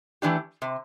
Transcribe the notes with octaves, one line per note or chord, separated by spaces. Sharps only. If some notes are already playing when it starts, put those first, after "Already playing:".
E3 A3 D4 G4
C3